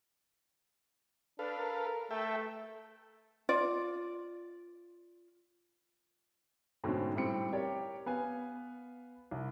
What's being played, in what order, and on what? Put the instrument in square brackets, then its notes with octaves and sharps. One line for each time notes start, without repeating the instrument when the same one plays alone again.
[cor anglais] D4 [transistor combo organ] A4 B4 F5
[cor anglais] A#4
[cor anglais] A3 [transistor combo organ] A4 E5 G5
[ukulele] F4 D5
[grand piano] G#2 B2 D3 A3 C4 C#4
A2 G3 C4 C#7
G4 A#4 C#5 D5
B3 B4 F5 G#5
C2